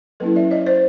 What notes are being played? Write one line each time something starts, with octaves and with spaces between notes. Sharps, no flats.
F#3 A#3 C#4 E4 A4 B4
D5 E5
C#5 D#5
C5 D5